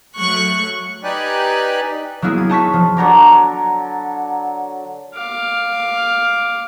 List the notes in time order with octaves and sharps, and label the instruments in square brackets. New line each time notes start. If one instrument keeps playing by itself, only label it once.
[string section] F#3 A3 C#6 F#6
[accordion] D#4 G4 B4 D5 G#5 F#6
[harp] F#3 A#3 B3 E4 G#4
G#6
D#4 A5 C#6 B6
F3
[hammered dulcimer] D3 F#3 A#5 D6
[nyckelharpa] F5 D6